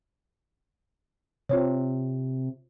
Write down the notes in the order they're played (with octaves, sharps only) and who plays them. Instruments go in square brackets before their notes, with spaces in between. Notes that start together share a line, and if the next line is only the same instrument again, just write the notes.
[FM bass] C3 [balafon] F4 C5 C#5